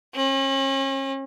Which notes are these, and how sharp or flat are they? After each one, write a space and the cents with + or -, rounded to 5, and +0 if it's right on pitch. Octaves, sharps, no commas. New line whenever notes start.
C#4 -40